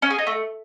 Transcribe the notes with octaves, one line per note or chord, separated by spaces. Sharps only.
C#4
G#4
D#4
A3